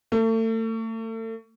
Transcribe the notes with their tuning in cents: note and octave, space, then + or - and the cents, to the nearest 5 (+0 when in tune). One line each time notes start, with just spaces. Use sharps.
A3 +35